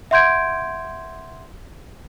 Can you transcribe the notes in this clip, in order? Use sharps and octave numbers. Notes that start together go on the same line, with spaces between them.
E5 F#5 C6 G6 G#6 D7